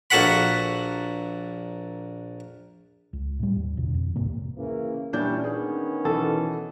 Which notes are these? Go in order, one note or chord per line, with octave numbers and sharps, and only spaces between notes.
A#1 A#3 F#4 A4 F#5 B5
C#2
A2 G3
D#2
A1 E2 B2 D3
F2
C#2 G#2 C3 A#3
C#3 E3 A#3
A#2 E3 G3 C#4 D4 G6
D#3 B3 C#4 G#4
B2 E3 A4